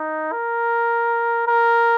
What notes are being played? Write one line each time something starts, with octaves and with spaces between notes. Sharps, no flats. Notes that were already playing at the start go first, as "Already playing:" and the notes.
Already playing: D#4
A#4
A#4